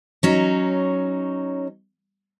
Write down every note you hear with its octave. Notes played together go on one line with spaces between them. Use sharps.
F#3 C#4 D#4